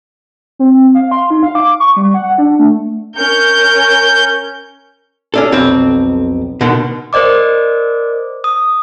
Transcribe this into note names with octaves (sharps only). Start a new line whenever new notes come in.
C4
F5
C6
D#4
F5
D6
C#6
G3
F#5
D4
A3
C#4 A#4 G6
C#4 D4 A4
B1 F2 C4
B2 D3 D#3
A#4 C5 D5 D#5 D6
D#6